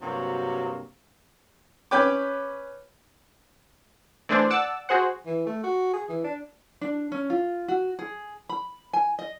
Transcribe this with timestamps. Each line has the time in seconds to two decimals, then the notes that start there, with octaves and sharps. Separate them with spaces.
0.01 G2 C3 F#3 A#3 F#4
1.91 C#4 B4 C#5 G5 D6
4.29 E3 A3 D4 G#4 C5 D5
4.50 D5 F#5 A5 D6 E6
4.89 F#4 G#4 C5 F#5
5.26 E3
5.46 A3
5.64 F#4
5.93 G#4
6.09 E3
6.24 D4
6.81 D4
7.12 C#4
7.30 F4
7.68 F#4
7.99 G#4
8.49 B5
8.93 G#5
9.19 D#5